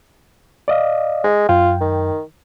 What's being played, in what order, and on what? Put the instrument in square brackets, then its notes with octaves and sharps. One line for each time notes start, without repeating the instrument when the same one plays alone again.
[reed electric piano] D5 D#5 F5
[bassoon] G#3
[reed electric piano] F#2 G5 [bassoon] F4
[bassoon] D#3